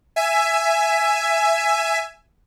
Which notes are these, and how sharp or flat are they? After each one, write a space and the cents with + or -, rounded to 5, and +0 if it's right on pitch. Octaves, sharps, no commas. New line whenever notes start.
E5 +15 G#5 +5